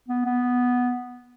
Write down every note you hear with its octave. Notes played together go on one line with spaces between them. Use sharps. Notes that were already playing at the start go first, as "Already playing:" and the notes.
B3
B3